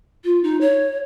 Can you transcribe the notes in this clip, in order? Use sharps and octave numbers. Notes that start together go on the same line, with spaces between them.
F4
D#4
C#5